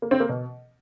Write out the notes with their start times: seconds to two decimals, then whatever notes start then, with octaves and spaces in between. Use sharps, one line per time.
0.02 A#3
0.11 C4
0.20 A#3
0.29 B2